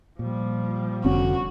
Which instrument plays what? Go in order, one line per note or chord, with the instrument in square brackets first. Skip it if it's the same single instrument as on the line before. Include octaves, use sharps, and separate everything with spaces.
[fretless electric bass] A#2 [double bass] F3 G3
[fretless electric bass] F1 D3 [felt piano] C#4 [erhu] F#4